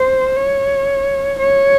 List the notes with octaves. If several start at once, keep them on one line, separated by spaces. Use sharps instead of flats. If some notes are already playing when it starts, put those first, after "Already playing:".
Already playing: C5
C#5
C#5